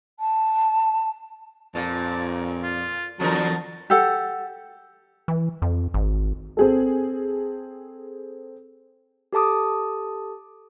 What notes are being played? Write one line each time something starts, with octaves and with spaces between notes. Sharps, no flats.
A5
F2 A#2 A5
F4
E2 D3 F#3 A#4 A5
G4 A4 F#5
E3
F2
G#1
C4 G#4 A4
G4 A4 A5 D6 D#6